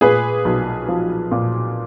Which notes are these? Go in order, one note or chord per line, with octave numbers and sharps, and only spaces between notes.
A#2 G#4 B4
B1
F3
A#2